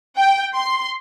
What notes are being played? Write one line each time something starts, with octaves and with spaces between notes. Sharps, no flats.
G5
C6